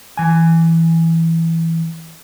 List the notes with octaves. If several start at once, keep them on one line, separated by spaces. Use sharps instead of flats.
E3 G#5